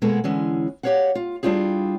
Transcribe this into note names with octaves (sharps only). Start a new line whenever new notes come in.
B2 G#3 A#3 B3 G#4 A4
D3 E3 G#3 C#4
G4 A#4 C#5 F5 F#5
F4
G3 D4 E4 F4 G4 G#4